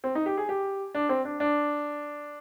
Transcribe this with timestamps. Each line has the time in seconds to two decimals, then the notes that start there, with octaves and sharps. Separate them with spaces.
0.04 C4
0.15 D#4
0.26 G4
0.37 G#4
0.49 G4
0.94 D4
1.09 C4
1.25 D4
1.40 D4